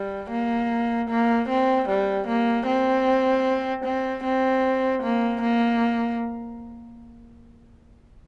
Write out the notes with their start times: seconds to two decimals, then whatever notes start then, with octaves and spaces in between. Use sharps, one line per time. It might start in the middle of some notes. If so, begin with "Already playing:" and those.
Already playing: G3
0.31 A#3
1.10 A#3
1.49 C4
1.89 G3
2.28 A#3
2.67 C4
3.85 C4
4.24 C4
5.03 A#3
5.42 A#3